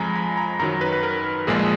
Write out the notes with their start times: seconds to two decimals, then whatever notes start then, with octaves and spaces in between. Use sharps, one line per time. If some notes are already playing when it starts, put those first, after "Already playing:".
Already playing: F2 F3 G#3 G#5 A#5 B5
0.16 B5
0.37 A#5
0.59 F#2 D#3 F#3 A#5
0.81 B4
0.93 B4
1.03 A#4
1.47 A#1 A#2 F3 G#3 G#4